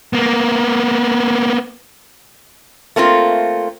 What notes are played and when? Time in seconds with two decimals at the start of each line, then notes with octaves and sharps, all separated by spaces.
0.13 A#3 B3
2.96 A3 A#3 C4 F4